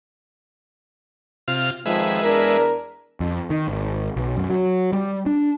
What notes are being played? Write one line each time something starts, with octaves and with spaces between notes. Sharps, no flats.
C3 F4 F6
F2 D#3 F3 G#3 B4 E5
E2 D4 A#4
F2
D#3
G#1
B1
F#2
F#3
G3
D4